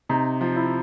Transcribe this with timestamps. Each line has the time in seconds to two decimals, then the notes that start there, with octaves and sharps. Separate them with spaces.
0.09 C3 D#4
0.41 F3
0.56 E4